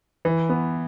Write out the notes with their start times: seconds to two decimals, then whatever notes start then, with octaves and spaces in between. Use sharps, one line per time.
0.25 E3
0.49 B3